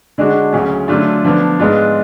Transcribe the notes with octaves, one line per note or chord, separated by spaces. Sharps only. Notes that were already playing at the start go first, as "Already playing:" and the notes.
D3 G#3 D4 F#4
D2 C#3 F#3 C#4
D3 F#3 A3 D4 F4
D3 F3 B3 D4
G#2 G#3 B3 D4 F4